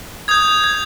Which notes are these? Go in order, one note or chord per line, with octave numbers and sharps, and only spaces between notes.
D#6 G6 G#6
G#6